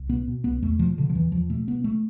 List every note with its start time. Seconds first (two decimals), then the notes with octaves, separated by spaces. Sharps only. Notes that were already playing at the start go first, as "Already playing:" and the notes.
Already playing: C2
0.09 B2 B3
0.28 B2
0.44 C2 B3
0.62 E2 A3
0.79 B2 F3
0.97 B2 D3
1.10 F3
1.15 E2 E3
1.32 E2 F3
1.49 B2 A3
1.67 B2 B3
1.84 A3